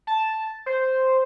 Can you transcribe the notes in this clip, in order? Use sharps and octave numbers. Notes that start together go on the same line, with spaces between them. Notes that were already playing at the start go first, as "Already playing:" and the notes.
A5
C5